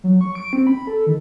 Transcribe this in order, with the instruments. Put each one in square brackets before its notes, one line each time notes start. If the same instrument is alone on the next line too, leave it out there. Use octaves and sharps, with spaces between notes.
[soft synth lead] F#3
C#6
D7
C4
B5
A4
D#3